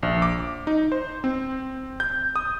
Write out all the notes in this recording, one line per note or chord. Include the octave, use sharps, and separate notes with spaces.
A#1
D6
D#4
C5
C4
G6
D#6